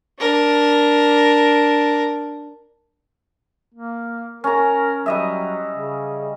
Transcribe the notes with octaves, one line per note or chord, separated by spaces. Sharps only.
D4 A#4
A#3
C#4 A#4 A#5
F#3 G3 D#5 E5
C#3